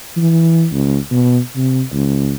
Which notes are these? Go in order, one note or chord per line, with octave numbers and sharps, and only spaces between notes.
E3
C#2
B2
C3
C#2